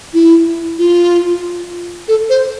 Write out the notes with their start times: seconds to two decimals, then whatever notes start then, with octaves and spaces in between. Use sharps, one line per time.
0.14 E4
0.79 F4
2.08 A4
2.30 C5